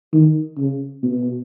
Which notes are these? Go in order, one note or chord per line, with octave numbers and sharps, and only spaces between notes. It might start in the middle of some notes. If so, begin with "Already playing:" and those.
D#3
C#3
B2